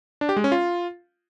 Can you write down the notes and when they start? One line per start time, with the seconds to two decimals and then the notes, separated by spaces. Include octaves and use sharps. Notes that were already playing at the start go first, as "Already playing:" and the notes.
0.21 D4
0.29 G4
0.36 G#3
0.44 C#4
0.52 F4